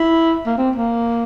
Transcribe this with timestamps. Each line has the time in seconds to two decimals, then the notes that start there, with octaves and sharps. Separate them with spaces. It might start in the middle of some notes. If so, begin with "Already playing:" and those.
Already playing: E4
0.46 A#3
0.58 C4
0.76 A#3